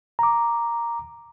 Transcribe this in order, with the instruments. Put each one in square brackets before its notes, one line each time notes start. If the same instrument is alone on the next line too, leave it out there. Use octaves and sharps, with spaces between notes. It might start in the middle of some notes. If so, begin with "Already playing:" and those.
[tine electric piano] A#5 D6